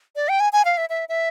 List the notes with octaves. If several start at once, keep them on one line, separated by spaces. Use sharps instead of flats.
D5
G5
G#5
G#5
F5
E5
E5
E5